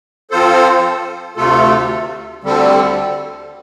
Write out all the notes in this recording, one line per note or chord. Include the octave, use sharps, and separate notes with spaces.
F3 C4 F4 A4 C5
D2 C3 A3 F4 A4
D2 D3 G3 C4 A4